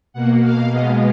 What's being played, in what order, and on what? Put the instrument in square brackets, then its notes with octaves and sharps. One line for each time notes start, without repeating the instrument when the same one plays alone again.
[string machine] B2 A#3 F#5
F5
B2 G#3 B3 D#5